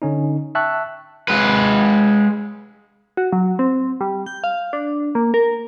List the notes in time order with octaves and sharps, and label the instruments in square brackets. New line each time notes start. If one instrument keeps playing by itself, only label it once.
[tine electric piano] D3 C#4 D#4
E5 G5 A5 C#6 E6 F#6
[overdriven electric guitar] G#3 B4
[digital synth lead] F#4
F#3
C4
G3
G6
F5
D4
A#3
A#4